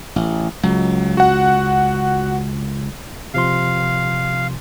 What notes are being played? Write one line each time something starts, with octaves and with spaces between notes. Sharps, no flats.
A1
C#2 F#3
F#4 F#5
C3 F3 F5 C6